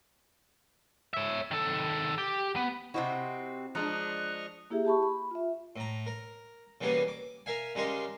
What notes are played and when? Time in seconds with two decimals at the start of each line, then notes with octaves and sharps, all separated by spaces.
1.14 C#5 E5
1.51 D#3 A4
2.18 G4
2.56 B3
2.94 C3 C4 E4 F#4 D#5
3.75 F3 G#3 D4 D#5 A#5 C#6 F6 F#6
4.70 A#3 E4 G4 G#4 E5
4.85 G4 A5 B5 C#6
5.03 B5
5.31 F4 E5
5.76 A2 A#5
6.06 A#4
6.81 C#3 E3 G3 A#3 B3 G#5
7.08 D6
7.46 A#4 E5 F5 G#5
7.75 C#3 G3 G#3 G4 A#4 C6